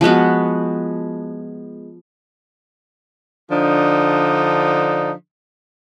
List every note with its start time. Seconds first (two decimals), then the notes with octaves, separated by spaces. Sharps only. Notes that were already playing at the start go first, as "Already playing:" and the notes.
0.01 F3 G#3 B3 F#4
3.51 D3 F3 D4 D#4